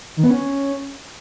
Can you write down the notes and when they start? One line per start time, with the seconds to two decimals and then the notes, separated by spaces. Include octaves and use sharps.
0.17 D#3
0.24 B3
0.30 C#4